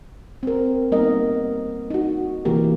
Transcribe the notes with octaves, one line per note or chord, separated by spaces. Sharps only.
C4 A#4
G3 A#3 B3 D#4 A#4 D#5
D#4 F#4
C3 E3 A#3 G4 A#4